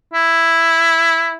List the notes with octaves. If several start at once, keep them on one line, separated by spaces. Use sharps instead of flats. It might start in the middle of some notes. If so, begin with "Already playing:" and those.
E4